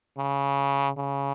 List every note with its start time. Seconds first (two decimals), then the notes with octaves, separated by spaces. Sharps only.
0.18 C#3
0.97 C#3